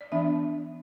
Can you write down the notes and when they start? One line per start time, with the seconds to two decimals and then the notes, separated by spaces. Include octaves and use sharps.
0.01 D5
0.12 E3 B3 D4 E5